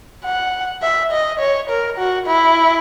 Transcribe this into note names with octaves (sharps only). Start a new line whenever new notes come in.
F#5
E5
D#5
C#5
A#4
F#4
E4